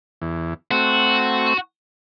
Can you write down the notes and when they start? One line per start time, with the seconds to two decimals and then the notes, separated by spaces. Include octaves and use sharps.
0.22 E2
0.71 A3 C4 F#4